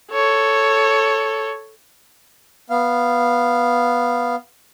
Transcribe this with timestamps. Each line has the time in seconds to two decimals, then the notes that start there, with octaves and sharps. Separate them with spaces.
0.11 A4 C#5
2.70 B3 F5